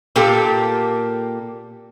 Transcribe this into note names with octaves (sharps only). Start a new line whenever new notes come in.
A#2 A#3 G4 A4